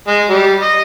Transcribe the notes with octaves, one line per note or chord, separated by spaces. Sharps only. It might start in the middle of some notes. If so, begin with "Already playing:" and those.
G#3
G3
D#5